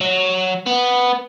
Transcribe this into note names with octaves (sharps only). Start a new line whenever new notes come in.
F#3
B3